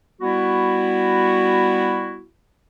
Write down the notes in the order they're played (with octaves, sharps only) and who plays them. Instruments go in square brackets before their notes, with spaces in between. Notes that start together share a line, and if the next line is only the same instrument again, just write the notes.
[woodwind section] G3 B3 E4 F#4